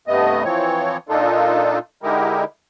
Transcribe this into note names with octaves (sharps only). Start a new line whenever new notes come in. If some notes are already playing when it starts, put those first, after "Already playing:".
G2 C3 A3 B3 D#5
E3 F3 C4 C#5
A#2 A#3 D4 D#4 F4 A4
D3 G#3 D#4 E4 G4 A#4